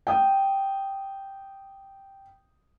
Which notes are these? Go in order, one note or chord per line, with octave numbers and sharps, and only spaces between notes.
G5 D#6